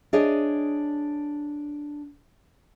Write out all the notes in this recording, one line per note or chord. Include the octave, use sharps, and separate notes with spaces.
D4 G#4 C#5 D#5